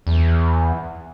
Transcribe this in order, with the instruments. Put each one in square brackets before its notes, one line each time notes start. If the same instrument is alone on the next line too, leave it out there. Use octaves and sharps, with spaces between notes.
[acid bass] E2